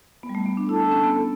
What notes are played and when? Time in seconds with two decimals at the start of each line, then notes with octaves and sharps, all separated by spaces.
0.23 B3
0.29 G3
0.35 A3
0.46 B3
0.57 D4
0.69 E4 A4
0.80 D4
0.92 C#4
1.03 B3